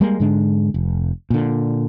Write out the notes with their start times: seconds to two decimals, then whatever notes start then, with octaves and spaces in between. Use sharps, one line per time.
0.01 G3 G#3 A#3
0.20 G#2 D3 G#3 D4
0.74 F1
1.30 A#2 D3